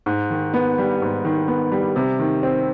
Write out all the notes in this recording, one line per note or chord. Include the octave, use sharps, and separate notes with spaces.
G#2
D#3
B3
G3
G#2
D#3
B3
G3
C3
D#3
C4